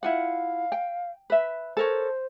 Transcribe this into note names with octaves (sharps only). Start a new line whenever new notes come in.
E4 F4 F5 F#5
G5
B4 E5
A4 A#4 C5 C#5